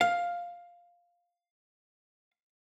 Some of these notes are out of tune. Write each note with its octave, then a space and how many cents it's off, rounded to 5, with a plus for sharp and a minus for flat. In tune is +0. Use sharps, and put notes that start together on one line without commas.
F5 +5